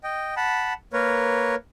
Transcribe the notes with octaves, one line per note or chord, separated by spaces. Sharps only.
D#5 G5
F#5 A5 B5
A#3 A#4 B4 C#5